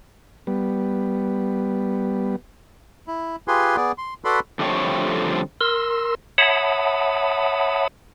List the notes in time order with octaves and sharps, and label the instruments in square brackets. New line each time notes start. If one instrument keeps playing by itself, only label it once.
[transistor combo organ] G3 B3
[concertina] E4
F4 G4 G#4 B4 G#5 C6
B3 G#4 D5
C6
F#4 A4 B4 D5 B5 C6
[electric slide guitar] F2 D3 G3 A3 C4 C#5
[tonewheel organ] A#4 C6 E6
C#5 E5 F#5 A5 B5 D#6